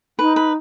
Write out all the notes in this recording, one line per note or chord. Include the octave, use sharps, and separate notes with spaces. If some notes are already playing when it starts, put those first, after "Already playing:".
D#4 B4
B4